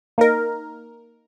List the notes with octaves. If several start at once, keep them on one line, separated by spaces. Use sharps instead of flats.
A#3 D#4 A#4